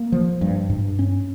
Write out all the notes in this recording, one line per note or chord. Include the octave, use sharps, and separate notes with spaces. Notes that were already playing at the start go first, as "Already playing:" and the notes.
Already playing: A#3
F3
G2
G2
C#4